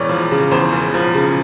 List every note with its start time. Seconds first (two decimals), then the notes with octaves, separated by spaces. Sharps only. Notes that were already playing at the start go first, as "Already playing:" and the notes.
Already playing: E1 E2 C#5 D5
0.09 F3
0.31 C#3
0.51 E2 C5
0.72 E1
0.94 F3
1.14 C#3